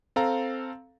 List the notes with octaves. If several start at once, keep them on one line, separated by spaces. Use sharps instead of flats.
C4 A4 F5 A#5